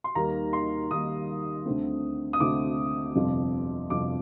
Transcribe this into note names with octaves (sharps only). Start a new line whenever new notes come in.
C6
D#2 D#3 G3 A#3 A#5
C6
D#2 D#3 G3 A#3 D#6
D2 D3 A3 C4
D#6
D2 D3 A3 C4 D6
G1 F2 C3 F3
G1 F2 C3 F3 D6